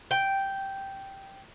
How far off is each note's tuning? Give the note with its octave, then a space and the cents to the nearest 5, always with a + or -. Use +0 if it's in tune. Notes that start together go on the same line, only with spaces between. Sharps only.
G5 -5